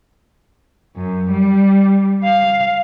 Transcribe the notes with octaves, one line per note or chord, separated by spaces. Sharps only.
F#2
G3
F5